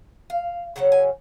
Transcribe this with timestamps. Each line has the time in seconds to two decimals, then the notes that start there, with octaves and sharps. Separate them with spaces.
0.30 F5
0.76 C#3 F#3 C#4 F#5
0.92 G#5